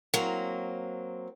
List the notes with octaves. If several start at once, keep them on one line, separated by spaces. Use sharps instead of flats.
F#3 A#3 C4